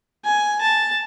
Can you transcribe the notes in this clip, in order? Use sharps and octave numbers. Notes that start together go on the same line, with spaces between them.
G#5
A5